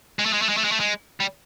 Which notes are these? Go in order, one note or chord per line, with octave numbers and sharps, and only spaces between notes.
G#3
A3
G#3
A3
G#3
A3
G#3
A3
G#3
G3